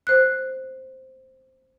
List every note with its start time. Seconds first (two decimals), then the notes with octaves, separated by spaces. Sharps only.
0.07 C5 F#6